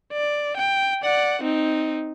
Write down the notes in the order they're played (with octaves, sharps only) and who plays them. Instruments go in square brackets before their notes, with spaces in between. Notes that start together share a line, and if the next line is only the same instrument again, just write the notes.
[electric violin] D5
G5
D5 F#5
C4 D#4